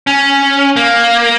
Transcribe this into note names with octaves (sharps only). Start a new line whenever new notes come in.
C#4
A#3